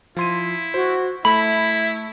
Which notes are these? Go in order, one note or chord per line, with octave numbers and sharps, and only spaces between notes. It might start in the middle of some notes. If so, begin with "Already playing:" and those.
F3 E4 C6 D#7
F#4 C5
A3 E4 E5 B5